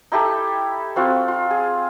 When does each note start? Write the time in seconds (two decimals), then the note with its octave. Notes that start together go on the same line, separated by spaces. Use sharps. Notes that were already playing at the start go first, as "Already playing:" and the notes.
0.12 D#4 E4 G4 A4
0.96 C4 F4 F#4
1.28 F4
1.51 G#4